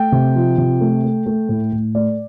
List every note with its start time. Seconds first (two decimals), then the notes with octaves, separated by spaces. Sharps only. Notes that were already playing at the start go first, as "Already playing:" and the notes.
Already playing: A3 G5
0.12 C3
0.35 F3
0.58 C3
0.81 A3
1.04 A3
1.26 A3
1.49 A2
1.72 A2
1.95 A3 D5